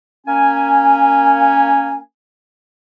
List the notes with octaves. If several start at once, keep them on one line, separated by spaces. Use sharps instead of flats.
A#3 C#4 G#5